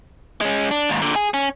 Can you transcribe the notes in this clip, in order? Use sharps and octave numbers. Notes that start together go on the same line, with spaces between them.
G#3 C#4
D4
D#2 G#2
A#2 D3
G#4
C#4